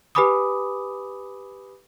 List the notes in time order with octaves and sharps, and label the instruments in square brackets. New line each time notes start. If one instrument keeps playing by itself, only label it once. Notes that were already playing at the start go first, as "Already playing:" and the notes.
[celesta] G4 B4 G#5 B5 D6 D#6